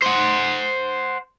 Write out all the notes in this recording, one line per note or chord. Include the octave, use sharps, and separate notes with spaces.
C5 F#5